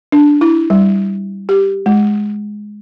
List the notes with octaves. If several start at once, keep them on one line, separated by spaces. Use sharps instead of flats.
D4
E4
G3
G4
G#3